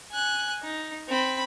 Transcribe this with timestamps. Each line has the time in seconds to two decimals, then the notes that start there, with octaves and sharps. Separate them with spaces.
0.12 G#5 F#6
0.63 D#4
1.08 C4 B5